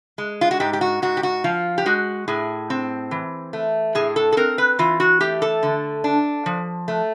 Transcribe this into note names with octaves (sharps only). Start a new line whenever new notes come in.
G#3
F4
F#4
G#2 G4
G4
F#4
G#2 F#4
G4
F#4
F3 F4
G4
G#3 F#4
A2 G#4
C4
E3
A3
A2 G#4
A4
A4
C4 A#4
B4
E3 F4
F#4
A3 G4
A4
D3
D4
F3
A3